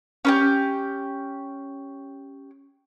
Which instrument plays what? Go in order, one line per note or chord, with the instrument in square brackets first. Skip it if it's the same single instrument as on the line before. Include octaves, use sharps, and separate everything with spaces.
[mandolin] C#4 D#4 G4